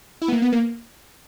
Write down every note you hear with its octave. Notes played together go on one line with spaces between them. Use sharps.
E4
B3
A#3
B3
A#3